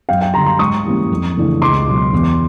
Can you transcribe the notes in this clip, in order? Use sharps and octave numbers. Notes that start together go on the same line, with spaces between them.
F#2 F5 G5
F5 G5
D3 G3 A#5 C6
A#5 C6
G#2 C#6 D#6
E3 G3 A#3 C#4
F2
C#3 E3 A3 D4
C#2 C6 D6
B2 F#3
E2